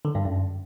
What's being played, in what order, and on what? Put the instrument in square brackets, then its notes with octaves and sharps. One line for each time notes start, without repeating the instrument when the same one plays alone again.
[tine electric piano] D3
G2
F#2